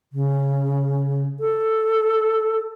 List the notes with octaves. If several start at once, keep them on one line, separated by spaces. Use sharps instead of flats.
C#3
A4